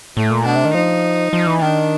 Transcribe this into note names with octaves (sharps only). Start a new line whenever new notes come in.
A2 A3
A#2
B2 D4
C3
D#3
F3 D#4
F3
E3
D#3 D4